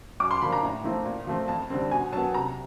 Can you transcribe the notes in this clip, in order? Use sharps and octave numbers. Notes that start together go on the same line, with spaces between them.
F#2 D6
C6
D3 F3 A#3 B5
A#5
A2
F3 A3 C4 E4
A#2
F3 A3 C4
F2 A5
D3 G3 C4
B2 G#5
F#3 B3 A5
C3 A#5